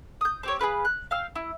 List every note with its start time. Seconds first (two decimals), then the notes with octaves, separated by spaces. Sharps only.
0.21 D#6 G6
0.43 C4 G4 C#5
0.59 G#4 A#4 B4 F5
0.85 F#6
1.11 F5 G5 E6 F6
1.36 E4